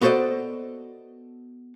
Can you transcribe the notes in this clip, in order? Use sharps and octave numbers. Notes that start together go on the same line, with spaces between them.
B3 F#4 A4 C5 D5 D#5